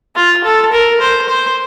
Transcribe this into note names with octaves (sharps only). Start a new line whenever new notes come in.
F4
A4
A#4
C5
C5